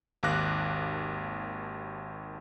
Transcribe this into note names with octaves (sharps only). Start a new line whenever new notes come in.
G#1 D#2 F5 D6 F#6 A#6